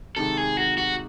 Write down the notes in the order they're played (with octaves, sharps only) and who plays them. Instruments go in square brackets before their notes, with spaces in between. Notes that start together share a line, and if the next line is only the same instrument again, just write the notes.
[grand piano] C3 D#3 G#3 D#4 [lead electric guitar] A4
[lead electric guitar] G#4
F#4
F#4